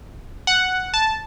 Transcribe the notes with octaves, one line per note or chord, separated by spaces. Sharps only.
F#5
A5